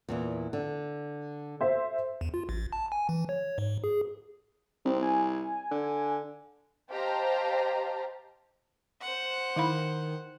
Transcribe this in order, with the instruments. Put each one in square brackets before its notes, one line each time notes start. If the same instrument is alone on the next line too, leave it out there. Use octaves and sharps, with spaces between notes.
[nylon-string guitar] E2 A#2 E3
D3
[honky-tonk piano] C5 E5
[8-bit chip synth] E2
F4
A1
A5
G#5
E3
C#5
G#2
G#4
[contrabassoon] C2 [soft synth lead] C4
[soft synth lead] G#5
[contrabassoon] D3
[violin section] G4 C5 D#5 F5 A5 A#5
[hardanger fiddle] C5 F#5
[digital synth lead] D#3 [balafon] E4 F5 B5